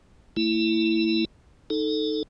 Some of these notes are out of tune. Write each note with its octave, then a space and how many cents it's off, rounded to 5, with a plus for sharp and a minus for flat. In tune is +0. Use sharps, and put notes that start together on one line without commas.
A3 +35 E4 +0
D#4 +0 A4 +0